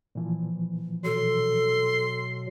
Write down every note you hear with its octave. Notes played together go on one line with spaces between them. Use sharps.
A#2 E3 F3
B2 F#3 A4 C6